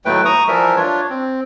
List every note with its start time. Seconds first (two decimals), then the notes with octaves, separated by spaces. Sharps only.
0.05 D#2 A2 F#3 A3 B4 G5
0.25 A#5 C#6 D#6
0.48 E3 F3 G3 A#4 E5
0.76 D4 F4 C#5
1.10 C4